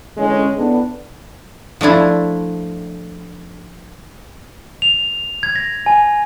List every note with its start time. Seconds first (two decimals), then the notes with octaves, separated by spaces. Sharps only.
0.17 D3 E3 G#3 C#4
0.57 A2 B3 D4
1.81 F3 A3 D4 E4
4.82 F7
5.43 G#6
5.56 A#6
5.86 G#5